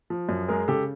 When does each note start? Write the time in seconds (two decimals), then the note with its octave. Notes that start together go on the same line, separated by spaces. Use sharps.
0.10 F3
0.29 F#2
0.48 G#3 G#4 A#4
0.68 C#3 G4 A4